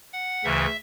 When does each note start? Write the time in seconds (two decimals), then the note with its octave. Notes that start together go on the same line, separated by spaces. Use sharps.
0.13 F#5
0.44 D2 C#3 E3 E5